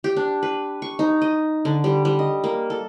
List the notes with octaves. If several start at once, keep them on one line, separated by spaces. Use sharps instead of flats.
G4
D4
B4
C#6
D#4
D#5
D3
G3
G3
D#5
A#3
A4